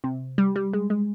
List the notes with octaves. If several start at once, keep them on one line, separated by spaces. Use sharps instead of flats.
C3
G3
G3
G#3
G#3